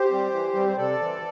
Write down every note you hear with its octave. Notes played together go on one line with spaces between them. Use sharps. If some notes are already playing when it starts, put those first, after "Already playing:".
Already playing: G4 C5
G3 C4
E3
G3 C4
C5
C3 A4 D5
E3 C4